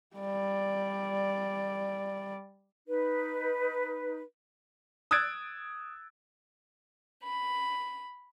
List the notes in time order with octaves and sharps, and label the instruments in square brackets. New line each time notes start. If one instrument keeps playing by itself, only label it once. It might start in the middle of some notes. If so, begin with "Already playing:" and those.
[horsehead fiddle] G3 D5
[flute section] D#4 B4
[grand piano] D#6 E6 F#6 G#6 A6 D7
[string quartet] B5